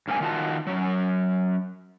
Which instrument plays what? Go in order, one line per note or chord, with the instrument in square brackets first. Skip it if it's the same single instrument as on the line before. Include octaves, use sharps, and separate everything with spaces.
[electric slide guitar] G2 A#3 C4 G#4 G#5
D#3 F4 F#4 A5
F#3 C#4